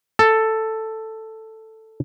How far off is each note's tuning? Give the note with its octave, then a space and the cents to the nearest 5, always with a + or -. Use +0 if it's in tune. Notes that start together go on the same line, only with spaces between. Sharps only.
A4 +5